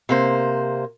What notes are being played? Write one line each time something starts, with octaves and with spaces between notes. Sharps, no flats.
C3 A#3 C5